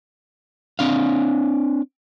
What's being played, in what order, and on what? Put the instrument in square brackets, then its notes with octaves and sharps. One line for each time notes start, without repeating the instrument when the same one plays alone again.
[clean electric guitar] C4 D4 F5